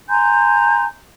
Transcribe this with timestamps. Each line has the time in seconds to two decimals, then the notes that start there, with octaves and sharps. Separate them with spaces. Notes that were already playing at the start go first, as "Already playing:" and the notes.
0.09 G#5 A#5 C6 G6